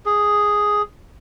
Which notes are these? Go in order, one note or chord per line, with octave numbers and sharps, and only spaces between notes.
G#4